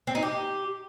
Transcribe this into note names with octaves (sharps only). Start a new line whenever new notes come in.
C4
D#4
G4